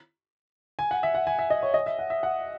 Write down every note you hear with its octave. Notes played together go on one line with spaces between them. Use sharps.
G#5
F#5
E5
F#5
G#5
E5
D#5
C#5
D#5
E5
F#5
E5
F#5